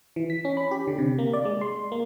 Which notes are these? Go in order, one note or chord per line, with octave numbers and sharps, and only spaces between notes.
E3
B6
C#4
B5
G4
D3
C3
A#3
D5
G#3
C6
A#3